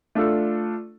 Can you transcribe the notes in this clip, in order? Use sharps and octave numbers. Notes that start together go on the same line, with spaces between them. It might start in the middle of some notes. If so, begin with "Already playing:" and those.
A3 D4 F4 A4